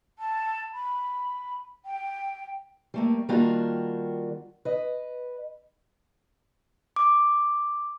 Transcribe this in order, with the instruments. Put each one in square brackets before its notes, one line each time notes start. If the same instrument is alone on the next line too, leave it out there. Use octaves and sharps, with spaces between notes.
[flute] A5
B5
G5
[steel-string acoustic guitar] G3 A3 A#3
D#3 G3 A#3 D4 F4 F#4
B4 D#5
[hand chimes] D6